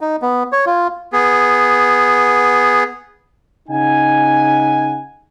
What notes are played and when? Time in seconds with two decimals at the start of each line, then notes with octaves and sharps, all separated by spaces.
0.01 D#4
0.22 B3
0.52 C#5
0.66 F4
1.13 B3 G#4
3.69 C#3 D#4 F#5 G#5